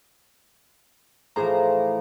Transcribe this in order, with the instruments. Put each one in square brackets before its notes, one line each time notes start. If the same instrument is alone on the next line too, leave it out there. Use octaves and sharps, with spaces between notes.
[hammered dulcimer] A2 E3 F3 [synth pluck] G#4 C5 A#5